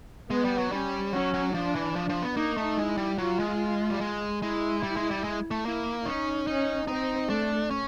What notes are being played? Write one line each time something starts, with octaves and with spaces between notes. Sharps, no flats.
G#3 B3
G3
F#3
G3 C#4
F#3 C#4
F#3
F3 D4
E3
F3
F3
B3
A#3 D#4
A3
G#3 E4
G3
F#3 F4
G#3
G3
G#3
G#3 E4
G3
G#3
G3
G#3
A3
A#3 E4
C#4 D#4
C#4 D#4
C4 D#4
A3 D4
C#4